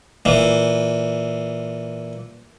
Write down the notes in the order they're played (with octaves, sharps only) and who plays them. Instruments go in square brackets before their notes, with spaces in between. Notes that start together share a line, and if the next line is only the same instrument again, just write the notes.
[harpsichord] A#2 E3